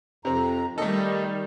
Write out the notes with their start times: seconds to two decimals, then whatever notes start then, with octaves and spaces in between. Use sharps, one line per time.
0.25 F2 C3 C4 A#5
0.78 D#3 G3 A3 A4 D#5